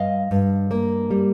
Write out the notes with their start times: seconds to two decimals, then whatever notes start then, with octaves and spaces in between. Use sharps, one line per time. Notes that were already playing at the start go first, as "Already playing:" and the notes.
Already playing: G2 D#5 F5
0.31 G2
0.71 A#3
1.11 G3